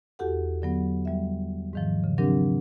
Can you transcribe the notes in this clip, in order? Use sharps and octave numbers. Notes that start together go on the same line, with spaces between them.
E2 F#4 G4 A4 F#5
D3 F#3 B3
G3 E5
G#2 D#3 F3
C#3
F#3 C4 D4 G4 A#4